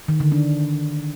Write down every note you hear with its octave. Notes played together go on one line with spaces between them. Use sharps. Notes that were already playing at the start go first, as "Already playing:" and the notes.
D#3
D3
D4